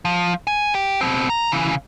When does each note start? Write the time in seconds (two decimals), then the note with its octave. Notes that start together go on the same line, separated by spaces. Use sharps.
0.05 F3
0.47 G#5
0.75 G4
1.01 B2 C4
1.30 A#5
1.52 C#3 E3